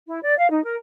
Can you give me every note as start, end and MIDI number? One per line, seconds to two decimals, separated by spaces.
0.07 0.19 64
0.23 0.36 74
0.37 0.49 77
0.50 0.62 63
0.64 0.76 70